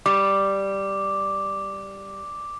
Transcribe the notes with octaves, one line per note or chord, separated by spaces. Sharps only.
G3 D6